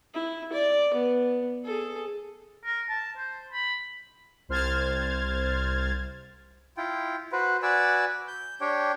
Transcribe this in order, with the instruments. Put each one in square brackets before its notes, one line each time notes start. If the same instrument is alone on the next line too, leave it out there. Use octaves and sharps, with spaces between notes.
[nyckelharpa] E4
D5
B3
G#4 A4
[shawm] A#4
A5
C5
B5
[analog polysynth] C2 C5 F6 G#6 A6
[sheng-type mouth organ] E4 F4 G5
F#4 B4 C5
F#4 B4 D5 G#5 E6
G6
D4 G4 C#5 G5